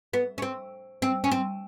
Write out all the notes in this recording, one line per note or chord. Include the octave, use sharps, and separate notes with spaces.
B3
C#4
C4
C4
C#4
C4